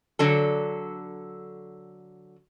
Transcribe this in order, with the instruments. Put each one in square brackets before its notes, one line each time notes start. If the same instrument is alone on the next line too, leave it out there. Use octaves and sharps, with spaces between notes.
[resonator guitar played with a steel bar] D3 F#3 A4